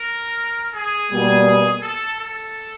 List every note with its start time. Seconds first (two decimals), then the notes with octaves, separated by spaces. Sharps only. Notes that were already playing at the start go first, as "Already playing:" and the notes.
Already playing: A#4
0.74 G#4
1.12 B2 G3 A#3
1.83 A4
2.20 A4